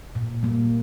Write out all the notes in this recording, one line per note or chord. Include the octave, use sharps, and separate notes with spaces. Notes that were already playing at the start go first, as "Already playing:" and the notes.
A#2
G3 A#3